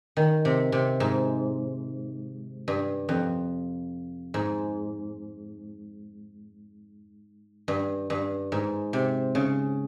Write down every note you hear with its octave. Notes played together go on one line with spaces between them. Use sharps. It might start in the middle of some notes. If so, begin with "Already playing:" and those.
D#3
C3
C3
G#2
G2
F2
G#2
G2
G2
G#2
C3
C#3